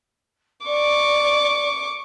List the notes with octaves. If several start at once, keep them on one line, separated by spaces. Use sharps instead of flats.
D5 C#6 D6